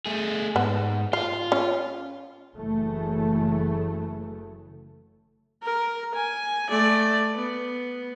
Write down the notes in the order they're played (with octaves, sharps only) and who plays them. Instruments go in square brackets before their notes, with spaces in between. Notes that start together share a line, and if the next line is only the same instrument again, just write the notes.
[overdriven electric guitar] A3 G#4
[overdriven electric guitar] G#2 [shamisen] B3
[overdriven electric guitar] F4 [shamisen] F5
[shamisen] C#4
[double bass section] F#1 C#3 E3 F#3 A3
[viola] A#4
G#5
A3 D5
B3